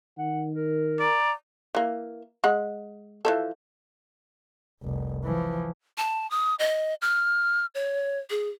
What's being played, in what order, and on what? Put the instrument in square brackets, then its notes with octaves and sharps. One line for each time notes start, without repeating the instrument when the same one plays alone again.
[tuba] D#3 [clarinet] F#5
[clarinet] A#4
[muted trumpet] D5 [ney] A#5
[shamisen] E3 A#3
G#3 F#5
E3 F3 A4
[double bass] F1 C2
E3 F3
[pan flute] A5
D#6
D#5
F6
C#5
G#4